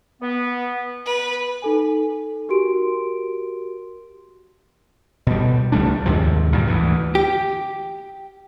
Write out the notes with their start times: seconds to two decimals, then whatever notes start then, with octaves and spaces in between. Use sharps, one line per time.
0.22 B3
1.06 B4
1.62 D#4 A4 G#5
2.49 F#4 G4 A#4 C6 D7
5.27 B2 G3
5.72 C#2 G3 A3 D4
6.06 D#2 G#2 C3 F3
6.52 D2 G2 A#2 G3
6.67 D2 E3
7.15 G4